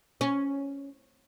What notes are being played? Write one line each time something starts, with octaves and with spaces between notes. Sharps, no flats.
C#4